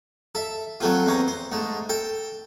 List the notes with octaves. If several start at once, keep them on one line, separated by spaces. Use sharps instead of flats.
A4 E5
F#3 A3 C4 F4
E2 C4 C#4 A#5
C5
G#2 A3
A4 G5